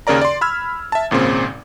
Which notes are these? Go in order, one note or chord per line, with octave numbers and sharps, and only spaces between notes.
D#2 C#3 A#4 D5 A#5
D5 C6
B5 E6 F6 G#6
E5 A5
G#1 A#2 C#3 C4